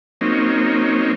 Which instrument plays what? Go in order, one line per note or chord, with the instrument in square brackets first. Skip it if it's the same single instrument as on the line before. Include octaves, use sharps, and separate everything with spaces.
[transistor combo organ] F#3 A#3 C4 C#4 D#4